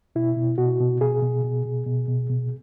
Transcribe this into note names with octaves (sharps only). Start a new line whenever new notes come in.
B2 E4
B2
B2 F#4
B2
B2 G#4
B2
B2
B2
B2
B2
B2